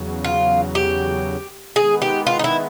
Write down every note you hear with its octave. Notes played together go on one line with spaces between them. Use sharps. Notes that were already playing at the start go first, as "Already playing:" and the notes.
Already playing: E2 C#3 F#3
F4
G4
D#3 G#3 B3 G#4
G4
F4
D#4
E4